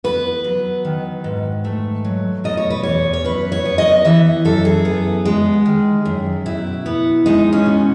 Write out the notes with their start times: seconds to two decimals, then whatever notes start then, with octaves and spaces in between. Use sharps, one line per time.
0.04 B3 B4
0.44 F#3
0.85 D#3
1.24 G#2
1.64 A3
2.05 F#3
2.44 B2 D#5
2.57 C#5
2.70 B4
2.83 E2 C#5
3.13 C#5
3.24 F#2 B4
3.52 C#5
3.65 B3
3.78 D#5
4.05 E3 E5
4.45 F#2 A4
4.65 G#4
4.85 B3
5.25 G#3
5.66 D#3
6.05 F#2
6.46 B2 E4
6.86 B3
7.26 G#3 D#4
7.53 C#4
7.66 B2